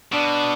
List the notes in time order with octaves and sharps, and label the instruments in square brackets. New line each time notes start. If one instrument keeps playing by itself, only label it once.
[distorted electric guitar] B2 [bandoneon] D4